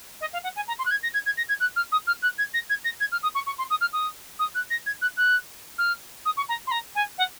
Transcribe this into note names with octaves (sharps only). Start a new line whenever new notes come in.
D#5
F5
F#5
G#5
A#5
C6
F#6
G#6
A#6
G#6
G#6
A#6
G#6
F#6
F6
D#6
F6
F#6
G#6
A#6
G#6
A#6
G#6
F6
D#6
C#6
C#6
C6
D#6
F6
D#6
D#6
F#6
A#6
G#6
F#6
F#6
F6
D#6
C#6
A#5
C6
A#5
G#5
F#5